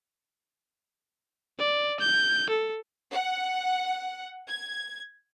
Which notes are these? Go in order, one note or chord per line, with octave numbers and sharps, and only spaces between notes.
D5
G6
A4
F#5
G#6